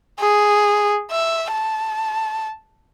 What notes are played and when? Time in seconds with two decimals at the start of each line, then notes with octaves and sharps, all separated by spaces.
0.20 G#4
1.11 E5
1.52 A5